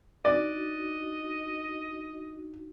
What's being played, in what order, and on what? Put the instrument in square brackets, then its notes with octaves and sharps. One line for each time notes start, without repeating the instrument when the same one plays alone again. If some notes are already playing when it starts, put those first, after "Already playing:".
[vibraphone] D4 D#4 F#4 [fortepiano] D5 [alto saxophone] D#5